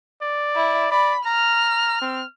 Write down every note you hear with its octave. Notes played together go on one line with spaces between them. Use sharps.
D5
E4
D5 B5
A#5 F6
C4